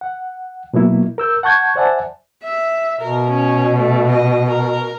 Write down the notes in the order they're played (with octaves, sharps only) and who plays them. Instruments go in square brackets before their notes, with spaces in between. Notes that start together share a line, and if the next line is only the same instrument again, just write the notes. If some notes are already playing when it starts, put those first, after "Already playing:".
[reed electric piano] F#5
B2 F#3 A#3 E4
A#4 E6 G6
F#5 A5 C#6 G6 G#6
C5 D5 E5 F#5 G#5 A5
[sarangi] E5
[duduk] B2 [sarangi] A#4
[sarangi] C#4
A3
D#5
A#4